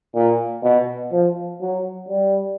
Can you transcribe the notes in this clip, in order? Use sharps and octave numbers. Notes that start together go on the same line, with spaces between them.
A#2
B2
F3
F#3
G3